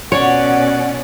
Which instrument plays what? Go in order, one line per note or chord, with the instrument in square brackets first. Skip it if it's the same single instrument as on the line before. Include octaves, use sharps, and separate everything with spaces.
[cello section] B2 C#4 [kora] C#5 [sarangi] D5 [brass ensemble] F#5